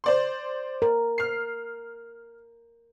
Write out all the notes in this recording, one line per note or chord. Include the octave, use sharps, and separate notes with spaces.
C5 D5 C6
A#4
F6 C7